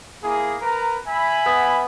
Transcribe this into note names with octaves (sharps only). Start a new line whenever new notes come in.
A#3 E4 G#4
A#4 B4 A#5
E5 G#5 B5
B3